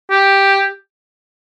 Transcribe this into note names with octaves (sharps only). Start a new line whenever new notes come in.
G4